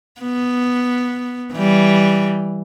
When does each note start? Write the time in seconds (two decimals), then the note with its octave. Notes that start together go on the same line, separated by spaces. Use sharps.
0.21 B3
1.53 E3 G3